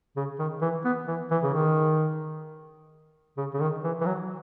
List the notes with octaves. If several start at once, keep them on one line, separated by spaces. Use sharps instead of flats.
C#3
D#3
E3
B3
E3
E3
C#3
D#3
C#3
C#3
D#3
E3
E3
F#3